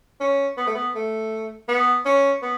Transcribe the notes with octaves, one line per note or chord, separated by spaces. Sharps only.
C#4
B3
A3
B3
A3
B3
C#4
B3